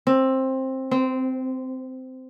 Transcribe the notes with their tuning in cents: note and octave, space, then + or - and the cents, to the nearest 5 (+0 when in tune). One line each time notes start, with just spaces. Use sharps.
C4 +15
C4 -15